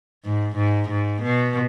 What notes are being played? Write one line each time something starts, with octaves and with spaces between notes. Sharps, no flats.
G#2
G#2
G#2
B2